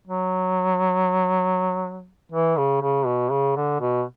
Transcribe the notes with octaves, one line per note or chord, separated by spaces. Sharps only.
F#3
E3
C#3
C#3
B2
C#3
D3
B2